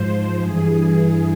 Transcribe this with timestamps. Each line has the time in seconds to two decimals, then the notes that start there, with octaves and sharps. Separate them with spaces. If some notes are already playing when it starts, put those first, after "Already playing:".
Already playing: G#2 F3 C5
0.40 G2 E3 G#4